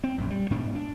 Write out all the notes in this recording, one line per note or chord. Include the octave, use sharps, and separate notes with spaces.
C4
A#1 F#2
G3
G#2 B2 D4
D4